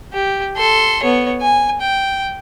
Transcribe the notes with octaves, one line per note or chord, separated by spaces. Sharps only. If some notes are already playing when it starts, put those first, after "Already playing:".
G4
A4 C6
B3 C#5
G#5
G5